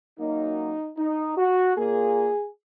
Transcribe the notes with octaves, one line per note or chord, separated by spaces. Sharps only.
F#2 F#3 A#3 D#4
D#4
F#4
A#2 A#3 G#4